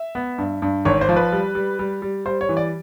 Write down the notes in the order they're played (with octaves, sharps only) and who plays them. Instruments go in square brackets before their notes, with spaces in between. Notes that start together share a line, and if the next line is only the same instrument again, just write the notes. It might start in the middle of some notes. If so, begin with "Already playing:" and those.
Already playing: [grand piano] E5
B3
G2
G2
G#1 C#5
C5
F3
B4
G3
G3
G3
G3
G3 C5
C#5
E3
D5